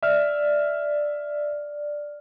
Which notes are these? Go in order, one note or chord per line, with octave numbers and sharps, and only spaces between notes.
D5 E5 F6